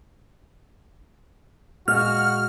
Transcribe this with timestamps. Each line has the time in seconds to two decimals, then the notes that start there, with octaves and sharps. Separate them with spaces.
1.88 A#2 G#3 F#4 F6